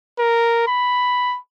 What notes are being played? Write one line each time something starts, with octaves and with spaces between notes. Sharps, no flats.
A#4
B5